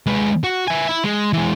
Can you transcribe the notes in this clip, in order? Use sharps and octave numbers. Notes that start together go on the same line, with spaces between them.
G#3 B4
F#4
E5 G#5
E4
G#3
E3 G#3